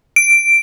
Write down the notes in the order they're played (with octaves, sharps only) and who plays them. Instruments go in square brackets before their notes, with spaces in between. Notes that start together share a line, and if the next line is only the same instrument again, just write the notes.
[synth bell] D7